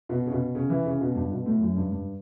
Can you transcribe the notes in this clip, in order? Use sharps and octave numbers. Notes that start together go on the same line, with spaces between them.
B2
C#3
B2
C#3
E3
C#3
B2
G2
B2
A2
F#2
G2
G2